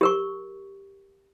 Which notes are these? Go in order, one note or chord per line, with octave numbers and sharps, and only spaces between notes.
G4 A#4 C#6